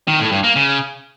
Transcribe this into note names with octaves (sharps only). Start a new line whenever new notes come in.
D#3
A2
G2
A#3
C#3